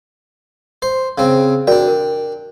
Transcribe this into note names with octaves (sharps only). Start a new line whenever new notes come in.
C5
C#3 C4
D4 F#4 A#4 D5 G5
A#4